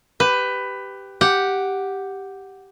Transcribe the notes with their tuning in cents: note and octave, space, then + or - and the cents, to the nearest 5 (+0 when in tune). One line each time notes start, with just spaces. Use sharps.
G4 +0 B4 +15
G4 +0 F#5 +0